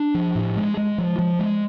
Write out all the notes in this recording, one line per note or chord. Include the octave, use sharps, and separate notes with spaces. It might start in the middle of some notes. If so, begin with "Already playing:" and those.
Already playing: D4
F3
A2
G#3
G#3
F3
F3
G#3